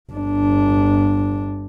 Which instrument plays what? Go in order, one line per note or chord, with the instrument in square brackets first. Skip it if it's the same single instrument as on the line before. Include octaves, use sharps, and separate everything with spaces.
[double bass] G1 D4